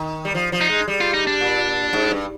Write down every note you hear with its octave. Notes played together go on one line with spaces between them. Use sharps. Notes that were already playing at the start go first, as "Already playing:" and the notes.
Already playing: D#3
G3
F3
F3
D#4
G#3
G3
F4
D#4
D4
A#2
G#2
G2